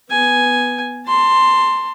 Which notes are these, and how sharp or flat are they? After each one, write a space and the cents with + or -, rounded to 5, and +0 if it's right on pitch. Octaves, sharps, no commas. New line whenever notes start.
B3 +0 G#5 +0
A5 +25 C6 +0